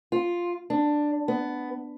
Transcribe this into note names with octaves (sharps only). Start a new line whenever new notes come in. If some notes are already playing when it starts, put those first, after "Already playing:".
F4
D4
B3